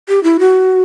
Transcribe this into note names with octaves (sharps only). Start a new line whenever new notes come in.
G4
E4
F#4